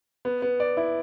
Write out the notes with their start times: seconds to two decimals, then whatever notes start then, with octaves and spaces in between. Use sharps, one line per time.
0.25 B3
0.42 B3
0.60 D5
0.77 E4